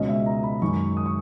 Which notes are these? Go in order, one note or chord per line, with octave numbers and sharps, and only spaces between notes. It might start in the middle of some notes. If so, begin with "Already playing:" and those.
Already playing: C#2 B2 G#3 C#4 D#5
E5
A#5
B5
F#2 D#3 G#3 C#6
D#6
C#6